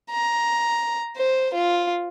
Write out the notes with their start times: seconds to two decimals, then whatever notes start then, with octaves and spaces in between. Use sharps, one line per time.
0.11 A#5
1.17 C5
1.54 F4